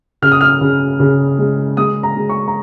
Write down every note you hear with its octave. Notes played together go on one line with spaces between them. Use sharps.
C#3 F6
D#6
F6
C#3
C#3
G#3
G#3 D#6
A#5
G#3
C#6
A#5